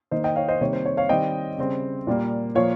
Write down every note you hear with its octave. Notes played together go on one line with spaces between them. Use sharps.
D#3 A#3 C5 D#5
D#5 G5
C#5 F5
C5 D#5
C3 D#3 G3 A#3 C#5
C5
C#5
C#5 F5
D#3 G3 C4 D#5 G5
C#3 G3 C4
A#2 G3 A#3
A#2 F3 A#3 C#5 F5